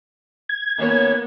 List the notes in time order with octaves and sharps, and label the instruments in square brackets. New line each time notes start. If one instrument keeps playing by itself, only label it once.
[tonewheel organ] G#6
[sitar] D#2 C#4 C#5 [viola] A#3 B3